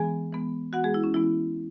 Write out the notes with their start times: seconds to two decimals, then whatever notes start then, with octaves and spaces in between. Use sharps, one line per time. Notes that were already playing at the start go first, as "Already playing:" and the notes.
Already playing: E3 G#3 B3 G#4 G#5
0.32 E3 G#3 B3
0.73 E3 G#3 B3 F#4 F#5
0.84 G#3 G#4
0.94 E4
1.04 C#4
1.14 E3 G#3 B3 E4